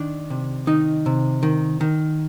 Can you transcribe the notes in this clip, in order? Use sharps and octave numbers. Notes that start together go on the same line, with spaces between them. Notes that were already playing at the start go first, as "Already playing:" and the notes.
Already playing: D#3 D4
C3
D#3 D#4
C3
D#3
D#3